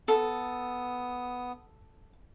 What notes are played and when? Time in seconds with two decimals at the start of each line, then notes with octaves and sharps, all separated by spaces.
0.08 B3 A4 D#6